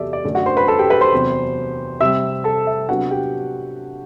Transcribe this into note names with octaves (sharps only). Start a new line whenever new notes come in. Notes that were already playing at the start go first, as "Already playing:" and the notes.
Already playing: E2 C3 F#3 G4 A4 D5 E5
D5
F#2 D3 A3 D4
F#4 F#5
C5 C6
B4 B5
A4 A5
G4 G5
B4 B5
C5 C6
E2 C3 F#3 C4
C3 G3 C4 E5 E6
A4 A5
E5
C3 F#3 B3 D4 F#4 F#5
G4 G5